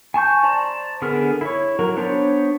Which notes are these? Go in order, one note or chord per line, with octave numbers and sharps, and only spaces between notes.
G#5 A5 C#6 G6
C5 D5 A5 A#5
D3 B3 G#4 A#4 F6
E4 C#5
F#3 A#4
B3 D4 C5 C#5